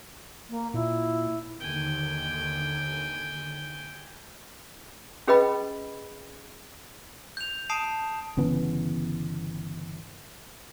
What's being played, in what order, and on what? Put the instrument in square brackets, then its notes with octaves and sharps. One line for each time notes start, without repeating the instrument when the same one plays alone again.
[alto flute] A#3
[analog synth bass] A#2 [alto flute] E4
[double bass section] D#2 D3 D#3 [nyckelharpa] G5 G#5
[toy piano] C#4 G#4 B4 D#5 G5 B5
[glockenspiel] G6 F7
A5 D#6 C7 D7 E7
[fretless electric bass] G1 C#3 E3 B3